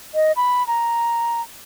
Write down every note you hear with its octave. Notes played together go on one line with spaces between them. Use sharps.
D#5
B5
A#5